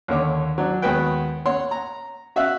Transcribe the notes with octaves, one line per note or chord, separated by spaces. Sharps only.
D#2 D3 C#5 D6
F#3 D4
D#2 G#3 B3 F#4 B4 G5
C#5 F#5 C6
A#5
F#4 E5 F5 E6 F#6